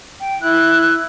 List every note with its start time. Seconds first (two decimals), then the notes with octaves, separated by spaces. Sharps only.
0.20 G5
0.41 E4 F#6